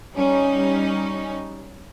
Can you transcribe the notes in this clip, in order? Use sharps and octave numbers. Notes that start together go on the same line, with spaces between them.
G3 C#4 D#4